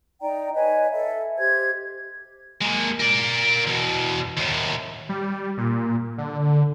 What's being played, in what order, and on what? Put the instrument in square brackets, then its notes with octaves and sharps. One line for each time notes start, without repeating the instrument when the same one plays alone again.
[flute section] D#4 D5 G5 A#5
B4 C#5 D#5 G#5
A4 E5
G4 C5 G#6
[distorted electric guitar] G#3 A#3
A#4 D5
E2 B2
D#2 A2
[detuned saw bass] G3
A#2
D3